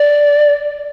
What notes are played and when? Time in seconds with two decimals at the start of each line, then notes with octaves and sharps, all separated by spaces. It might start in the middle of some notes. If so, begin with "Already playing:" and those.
Already playing: D5